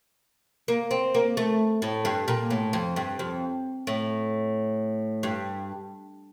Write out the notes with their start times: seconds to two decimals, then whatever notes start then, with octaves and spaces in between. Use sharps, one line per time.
0.68 A#3
0.91 C4
1.15 A#3
1.37 A3
1.82 A2
2.05 G2
2.28 A#2
2.50 A2
2.73 F2
2.96 G2
3.19 F2
3.87 A2
5.23 G2